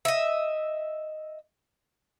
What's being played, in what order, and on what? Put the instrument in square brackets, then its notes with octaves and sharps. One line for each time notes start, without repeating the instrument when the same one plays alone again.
[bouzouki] D#5 E5